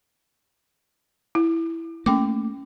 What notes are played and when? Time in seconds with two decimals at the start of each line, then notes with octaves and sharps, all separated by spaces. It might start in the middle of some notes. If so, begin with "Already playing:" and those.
1.35 E4
2.06 A3 A#3 C#4 G5 D6